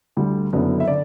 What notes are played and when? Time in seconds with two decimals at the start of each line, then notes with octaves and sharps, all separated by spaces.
0.17 D2 D3 G3
0.53 F#1 F#2 D3 F#3 B3
0.80 E5
0.88 D3 D5